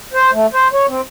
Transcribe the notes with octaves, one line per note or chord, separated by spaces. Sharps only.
C5
A3
C5
C#5
C4